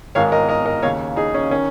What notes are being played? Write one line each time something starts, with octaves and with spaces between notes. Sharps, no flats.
G#1 G#2 D#3 C#5 F5
A#4 D#5
A#4 D#5
A#4 D#5
D#2 C#3 C#5 F5
D#4 G#4
C#4
D#3 C#4